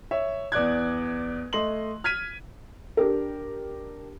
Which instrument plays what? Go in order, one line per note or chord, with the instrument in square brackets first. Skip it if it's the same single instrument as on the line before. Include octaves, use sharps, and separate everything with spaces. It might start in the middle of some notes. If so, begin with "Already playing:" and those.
[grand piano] C#5 E5
E2 D5 F#6 G#6
A3 D#5 C6 F#7
F6 G#6 B6 D#7
[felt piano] D4 G4 A#4